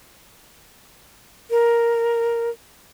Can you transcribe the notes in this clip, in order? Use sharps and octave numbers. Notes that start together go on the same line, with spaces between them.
A#4